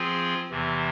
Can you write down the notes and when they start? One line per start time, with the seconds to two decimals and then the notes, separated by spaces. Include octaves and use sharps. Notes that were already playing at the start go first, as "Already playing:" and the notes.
Already playing: F3 C4 F4 G#4
0.50 E2 C3 E3